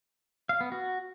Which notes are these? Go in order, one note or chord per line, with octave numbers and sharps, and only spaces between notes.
F5
B3
F#4